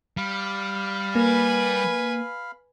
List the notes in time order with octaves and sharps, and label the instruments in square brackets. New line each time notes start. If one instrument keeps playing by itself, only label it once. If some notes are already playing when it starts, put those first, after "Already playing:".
[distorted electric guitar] G3 [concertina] F5 B5
[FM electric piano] A#3 [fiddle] B4 G#5